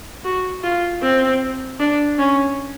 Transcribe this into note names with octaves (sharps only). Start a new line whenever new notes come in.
F#4
F4
C4
D4
C#4